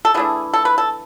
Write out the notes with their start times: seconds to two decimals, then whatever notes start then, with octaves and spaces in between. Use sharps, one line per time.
0.05 A4
0.14 E3 A3 D4 G#4
0.54 A4
0.65 B4
0.78 A4